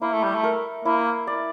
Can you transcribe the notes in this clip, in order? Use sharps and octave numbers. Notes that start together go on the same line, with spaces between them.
A#3 E4
A3
G3
A3
A#4
A#3 E4
D5